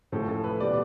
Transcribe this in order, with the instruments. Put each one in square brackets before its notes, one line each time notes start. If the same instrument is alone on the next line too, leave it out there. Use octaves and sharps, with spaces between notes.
[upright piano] A1 A2 F3 A4
A4
B4
B2 G3 D5